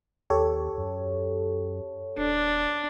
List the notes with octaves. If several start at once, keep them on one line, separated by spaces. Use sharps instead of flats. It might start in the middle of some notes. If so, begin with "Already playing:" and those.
D#2 G4 A4 C#5
F#2
D#1 D4